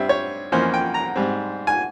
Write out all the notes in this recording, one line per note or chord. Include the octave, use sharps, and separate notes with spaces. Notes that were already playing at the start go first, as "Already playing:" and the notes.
Already playing: G2 G3 C4 E5
C#5
F2 E3 A#3 C#4 C5
G5
A#5
G#2 G3 C4
G#5